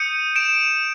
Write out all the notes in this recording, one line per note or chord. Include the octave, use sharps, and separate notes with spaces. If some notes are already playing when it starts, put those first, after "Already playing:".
Already playing: D#6 G6 C#7 D#7
D7 E7